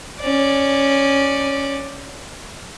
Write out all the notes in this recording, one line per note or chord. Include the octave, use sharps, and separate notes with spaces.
C#4 D5